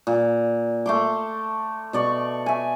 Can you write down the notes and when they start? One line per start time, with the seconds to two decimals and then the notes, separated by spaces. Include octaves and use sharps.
0.07 A#2
0.86 A3 C6 D6
1.93 B2 D5 C#6
2.46 E5 G#5